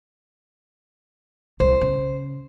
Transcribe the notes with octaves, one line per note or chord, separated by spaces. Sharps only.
C2 C5
C#3